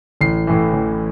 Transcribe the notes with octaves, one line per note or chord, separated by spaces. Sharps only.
A1 C7
A2 E3
A1